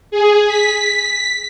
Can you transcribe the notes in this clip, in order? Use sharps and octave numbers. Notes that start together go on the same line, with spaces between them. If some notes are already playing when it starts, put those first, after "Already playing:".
G#4
B6